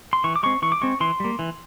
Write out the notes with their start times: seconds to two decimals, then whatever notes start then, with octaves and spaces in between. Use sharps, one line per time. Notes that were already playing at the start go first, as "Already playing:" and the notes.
0.13 C6
0.24 E3 C#6
0.36 D6
0.43 G#3 C4 C#6
0.62 E3 C#6
0.72 D6
0.81 G#3 C4 C#6
1.00 E3 C6
1.20 G3 A#3
1.39 E3